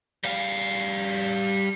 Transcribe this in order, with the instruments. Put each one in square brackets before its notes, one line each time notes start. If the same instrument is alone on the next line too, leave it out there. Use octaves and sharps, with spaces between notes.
[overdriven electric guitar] G3 F5